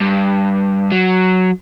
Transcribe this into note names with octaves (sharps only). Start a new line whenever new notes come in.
G2
F#3